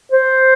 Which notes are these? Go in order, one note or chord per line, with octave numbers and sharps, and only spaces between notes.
C5